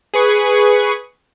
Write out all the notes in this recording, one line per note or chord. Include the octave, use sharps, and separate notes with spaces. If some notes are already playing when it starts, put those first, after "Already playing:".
G#4 B4 C#6